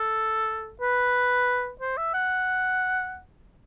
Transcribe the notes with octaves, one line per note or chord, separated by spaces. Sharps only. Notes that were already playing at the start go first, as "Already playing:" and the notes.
Already playing: A4
B4
C5
E5
F#5